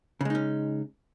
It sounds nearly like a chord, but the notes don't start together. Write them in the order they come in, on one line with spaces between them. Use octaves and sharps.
C#3 G#3 D#4 C#4